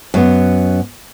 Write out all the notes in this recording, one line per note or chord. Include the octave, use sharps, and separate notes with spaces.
F#2 B3